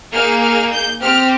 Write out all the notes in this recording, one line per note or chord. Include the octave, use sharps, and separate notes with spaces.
A#3 D#4 G#4 F6
F6
G6
C4 G4 F6